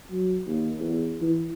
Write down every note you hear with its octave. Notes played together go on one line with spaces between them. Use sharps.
F#3
D#2
E2
E3